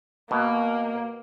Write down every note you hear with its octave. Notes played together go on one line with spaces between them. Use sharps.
B2 A#3